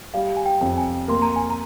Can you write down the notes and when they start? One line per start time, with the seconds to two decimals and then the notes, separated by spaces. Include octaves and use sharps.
0.14 G3 F5
0.37 G#5
0.46 G5
0.61 F2
0.78 G#5
1.08 A#3 C6
1.22 A#5
1.36 G#5
1.50 A#5